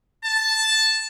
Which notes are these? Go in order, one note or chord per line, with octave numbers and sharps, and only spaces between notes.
A5